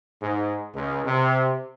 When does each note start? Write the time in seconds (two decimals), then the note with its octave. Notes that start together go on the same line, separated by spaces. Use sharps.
0.22 G#2
0.75 C#2
1.06 C3